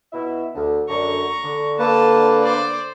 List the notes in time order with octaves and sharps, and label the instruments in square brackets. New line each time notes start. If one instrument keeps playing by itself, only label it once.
[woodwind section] B2 E4 E5
D2 D3
[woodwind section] F#2 D3 [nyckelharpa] A#5 C#6
[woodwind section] D3
[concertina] A#3 B4 [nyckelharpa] A4 A5
[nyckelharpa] C5 D5